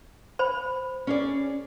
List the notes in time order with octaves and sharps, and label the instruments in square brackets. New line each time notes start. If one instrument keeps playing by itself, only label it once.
[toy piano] C5 B5
[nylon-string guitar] C#4 G#4 D5